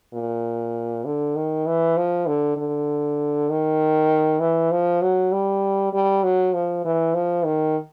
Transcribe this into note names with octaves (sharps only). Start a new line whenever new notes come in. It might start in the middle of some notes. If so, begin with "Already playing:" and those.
A#2
D3
D#3
E3
F3
D3
D3
D#3
E3
F3
F#3
G3
G3
F#3
F3
E3
F3
D#3